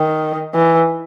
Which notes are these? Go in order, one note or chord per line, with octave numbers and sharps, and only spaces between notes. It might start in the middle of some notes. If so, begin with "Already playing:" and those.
Already playing: D#3
E3